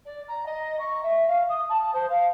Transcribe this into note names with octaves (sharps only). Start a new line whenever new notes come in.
D5
A#5
D#5
C#6
E5
F5
D#6
A5
C5
F5